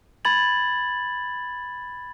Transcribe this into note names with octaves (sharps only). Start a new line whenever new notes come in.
B5 G#6 A6 F#7